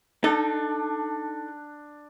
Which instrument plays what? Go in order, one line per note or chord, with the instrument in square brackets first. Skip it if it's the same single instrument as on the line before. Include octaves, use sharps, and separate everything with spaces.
[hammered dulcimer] D4 [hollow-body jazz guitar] D#4 A4